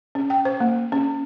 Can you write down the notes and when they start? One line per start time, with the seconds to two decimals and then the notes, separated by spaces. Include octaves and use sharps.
0.15 C#4
0.30 G5
0.45 C5
0.60 A#3
0.92 C#4